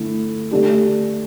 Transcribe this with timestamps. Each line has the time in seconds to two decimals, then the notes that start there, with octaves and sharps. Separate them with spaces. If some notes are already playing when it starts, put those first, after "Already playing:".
Already playing: D3 A3 E4
0.51 D3 A3 D4 G4